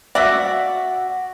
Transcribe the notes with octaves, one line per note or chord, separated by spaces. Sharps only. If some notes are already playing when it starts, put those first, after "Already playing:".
F#4 D5 E5 F#5